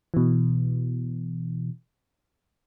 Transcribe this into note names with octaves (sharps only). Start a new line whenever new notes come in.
B2 E3